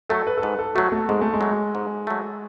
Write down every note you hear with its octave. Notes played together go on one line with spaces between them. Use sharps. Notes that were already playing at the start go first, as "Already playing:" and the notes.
F#3 A3 A4
B4
A4
G#2 B4
A4
F#3 A3 F#4
A3
G#2 G#3
A3
G#3
F#3 A3
G#2
F#3 A3